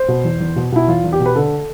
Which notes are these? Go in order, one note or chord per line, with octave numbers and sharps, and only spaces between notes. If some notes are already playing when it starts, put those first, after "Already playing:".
Already playing: C5
B2
E2
E2
B2
B2 E4
E2 F4
E2
G4
B2
B4
D3 A4